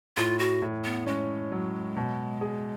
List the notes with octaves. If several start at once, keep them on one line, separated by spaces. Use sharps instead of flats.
A2 F4
F#4
A2
B3
G#3 C#4
F#3
B2
G#4